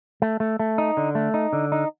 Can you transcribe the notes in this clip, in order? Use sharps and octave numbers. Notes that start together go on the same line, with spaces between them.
A3
A3
A3
D#4
D3
A3
D#4
D3
D#4